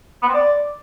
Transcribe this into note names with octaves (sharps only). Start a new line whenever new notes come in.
B3
C4
D5